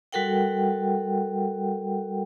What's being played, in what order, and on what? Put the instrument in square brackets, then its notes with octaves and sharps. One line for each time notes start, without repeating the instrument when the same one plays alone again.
[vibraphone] G3 F#4 A4 A#4 F#5 G5